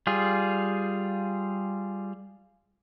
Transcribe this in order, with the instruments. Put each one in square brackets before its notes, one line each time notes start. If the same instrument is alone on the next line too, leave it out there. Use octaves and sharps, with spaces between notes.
[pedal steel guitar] G3 F4 G#4